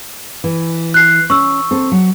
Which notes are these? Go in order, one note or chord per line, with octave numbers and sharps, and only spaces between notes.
E3
F#6 C7
C#4 C#6 E6
C4 A4
F#3